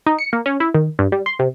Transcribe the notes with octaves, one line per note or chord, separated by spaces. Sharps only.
D#4
C#7
A#3
C#4
E4
D#3
G2
G3
C6
C3